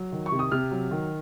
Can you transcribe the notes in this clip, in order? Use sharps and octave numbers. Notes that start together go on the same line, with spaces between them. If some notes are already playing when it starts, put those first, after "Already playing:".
Already playing: F#3
D#3
C#6
C3
D#6
C3 F6
F#3
D#3